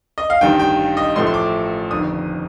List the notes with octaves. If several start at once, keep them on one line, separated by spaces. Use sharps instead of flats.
D#5
F5
A1 G2 D#3 G5
G5
D#5
A1 A2 F3 A3 C6
C6
D6
G1 F2 D#3 D#6